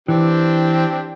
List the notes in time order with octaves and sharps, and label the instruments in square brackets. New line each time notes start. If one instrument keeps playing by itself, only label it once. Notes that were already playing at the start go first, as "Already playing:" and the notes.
[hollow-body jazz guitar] E3 [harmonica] C4 D4 G4